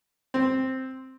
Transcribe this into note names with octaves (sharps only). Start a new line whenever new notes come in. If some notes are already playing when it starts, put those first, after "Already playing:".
C4